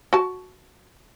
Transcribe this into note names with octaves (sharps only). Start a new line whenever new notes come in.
F#4 A5